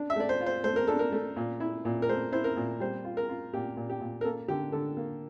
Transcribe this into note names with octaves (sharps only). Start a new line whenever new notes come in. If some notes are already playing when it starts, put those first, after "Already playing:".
Already playing: D4
E5
A3 D5
C5
F4
C5
A3 C5
A#4
D4 A4
A#4
A3
A#2
E4
A#2
A#4
A3 C5
E4 C5
A#4
A#2
G3 C5
F4
A#4
F4
A#2 G4
A#2
G4
A#2
A#4
A#3 A4
D3 G4
D3 A4
A#3